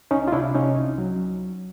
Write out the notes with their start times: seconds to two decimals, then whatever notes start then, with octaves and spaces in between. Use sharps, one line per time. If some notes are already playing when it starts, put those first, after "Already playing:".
0.11 C#2 C#4 D#4
0.28 F4
0.32 C3 D4 E4
0.55 C3 C#4 D#4
0.76 C2
0.98 F#3